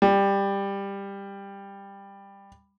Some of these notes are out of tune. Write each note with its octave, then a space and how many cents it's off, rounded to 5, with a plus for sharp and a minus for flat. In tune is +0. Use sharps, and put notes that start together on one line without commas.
G3 +15